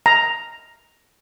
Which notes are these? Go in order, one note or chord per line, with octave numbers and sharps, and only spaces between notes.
A#5